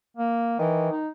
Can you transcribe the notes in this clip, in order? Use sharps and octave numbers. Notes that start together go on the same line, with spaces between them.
A#3
D#3 E3
D#4